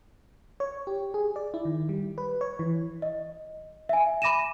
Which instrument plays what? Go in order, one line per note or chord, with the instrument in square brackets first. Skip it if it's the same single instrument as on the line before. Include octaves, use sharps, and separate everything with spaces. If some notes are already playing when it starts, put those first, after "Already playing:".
[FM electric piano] C#5
G4
G#4
D5
E4
D#3
G3
B4
C#5
E3
[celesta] D#5
E5 G#5
B5 D6 A#6 D#7 E7